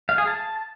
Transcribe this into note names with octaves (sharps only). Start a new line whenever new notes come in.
F5
G#4
A5